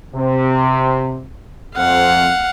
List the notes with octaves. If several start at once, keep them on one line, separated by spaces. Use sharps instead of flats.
C3
F2 F5 F#5